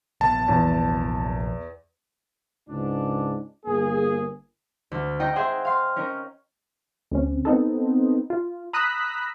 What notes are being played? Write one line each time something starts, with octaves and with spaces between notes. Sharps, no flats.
A#1 B3 A5
E2
C#2 G#2 D4
G1 A#3 G#4
D2
D#4 D#5 G5 A#5
G#4 C5 D#5 E5 F#5 G5
F5 C6
C#4 D#4 A#4
D2 C4 C#4
B3 C4 D#4 A4
F4
A#5 B5 D#6 E6 F#6 B6